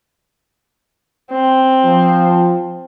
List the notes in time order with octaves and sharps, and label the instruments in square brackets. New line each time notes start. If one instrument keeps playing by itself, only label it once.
[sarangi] C4
[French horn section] F3